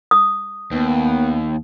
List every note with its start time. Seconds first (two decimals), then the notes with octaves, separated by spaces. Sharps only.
0.11 D#6
0.72 D#2 B3